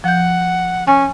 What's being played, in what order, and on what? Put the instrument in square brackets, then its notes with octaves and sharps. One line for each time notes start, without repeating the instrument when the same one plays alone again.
[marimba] F3 G6 [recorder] F#5
[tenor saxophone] C#4 [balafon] G#5